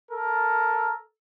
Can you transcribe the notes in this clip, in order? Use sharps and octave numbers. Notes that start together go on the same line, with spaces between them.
A4 A#4